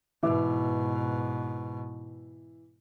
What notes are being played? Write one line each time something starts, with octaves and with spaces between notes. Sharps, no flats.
G#2 B2 E3 E5 D6